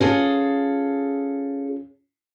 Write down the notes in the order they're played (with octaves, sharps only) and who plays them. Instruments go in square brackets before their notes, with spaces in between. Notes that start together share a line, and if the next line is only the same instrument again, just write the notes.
[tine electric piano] C#4 [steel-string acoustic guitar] F4 G#4 A4